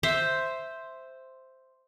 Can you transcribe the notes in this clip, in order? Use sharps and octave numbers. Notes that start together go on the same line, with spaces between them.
C5 E5